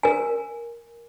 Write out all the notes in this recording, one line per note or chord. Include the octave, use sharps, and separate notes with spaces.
A#4 G#5